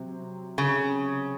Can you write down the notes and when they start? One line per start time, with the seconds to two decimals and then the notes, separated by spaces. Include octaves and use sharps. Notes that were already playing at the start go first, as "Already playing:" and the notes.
Already playing: C3 F#3 C4
0.58 C#3